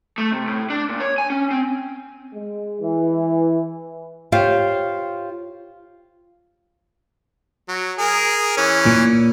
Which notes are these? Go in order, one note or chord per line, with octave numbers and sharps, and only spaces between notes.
A3
C3
A2
D4
A#2
C#5
G#5
C#4
C4
G#3
E3
F4 G4 C5 C#5 F5
F#3
G#4 A#4
E3 C#4
A#2